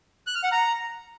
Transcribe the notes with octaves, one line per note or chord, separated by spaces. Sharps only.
F#6
F6
F#5
A#5